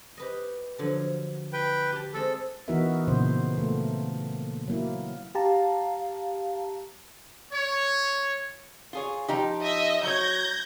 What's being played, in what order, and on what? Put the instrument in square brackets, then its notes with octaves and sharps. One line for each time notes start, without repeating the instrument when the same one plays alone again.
[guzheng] G4 B4 D#5
D3 F3 F#3
[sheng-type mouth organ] B4 G5
[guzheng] G4 A5
[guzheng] G#3 C4 D#5 [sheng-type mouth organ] A4
[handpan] E3 B3 D#4 F#4 A#4 E5
A#2 C#3 C5
A3 A#3
F#3 A#3 E4
[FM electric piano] G4 A5 A#5 [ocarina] F5
[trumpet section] C#5
[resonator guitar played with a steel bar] F4 G#4 C#5
F3 D#4 G4
[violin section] D#5 E5
[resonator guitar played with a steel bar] F#3 C#5 [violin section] G6 G#6 A#6